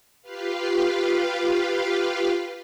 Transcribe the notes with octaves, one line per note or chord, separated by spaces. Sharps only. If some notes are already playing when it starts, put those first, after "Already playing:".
F4 G4 B4 F5